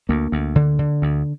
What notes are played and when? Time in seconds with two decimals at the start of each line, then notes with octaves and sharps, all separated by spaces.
0.09 D2 A#3
0.32 D2
0.56 D3
0.79 D3
1.02 D2